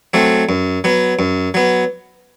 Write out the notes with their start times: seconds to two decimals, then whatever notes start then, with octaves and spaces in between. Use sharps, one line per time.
0.14 F#3 A3 C4
0.49 F#2
0.84 F#3 B3
1.19 F#2
1.54 F#3 B3